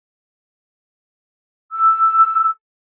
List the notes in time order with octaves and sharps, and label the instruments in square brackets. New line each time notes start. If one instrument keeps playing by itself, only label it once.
[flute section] E6